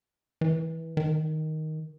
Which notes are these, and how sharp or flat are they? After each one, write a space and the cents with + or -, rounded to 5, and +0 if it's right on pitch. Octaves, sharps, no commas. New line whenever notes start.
E3 -20
D#3 +5